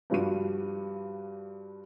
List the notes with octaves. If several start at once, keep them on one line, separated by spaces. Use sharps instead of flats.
G2 F3 G3 F4 F#4 D#7